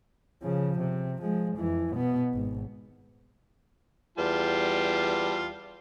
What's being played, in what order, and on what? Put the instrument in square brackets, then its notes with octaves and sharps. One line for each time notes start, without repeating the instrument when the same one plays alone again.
[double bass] C#3 F3
C3
F3 G#3
F2 E3
B2 B3
G#1
[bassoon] E2 [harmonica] G3 F4 A5